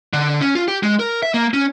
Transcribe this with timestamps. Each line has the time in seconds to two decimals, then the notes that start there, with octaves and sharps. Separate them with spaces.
0.13 D3
0.41 C#4
0.55 F4
0.68 G4
0.83 G#3
0.99 A#4
1.23 E5
1.34 A#3
1.54 C#4